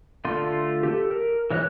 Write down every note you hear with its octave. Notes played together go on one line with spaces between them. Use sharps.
D3 A3 F4 C6
G4 A4
A#4
E3 G#3 C#5 E5 F#6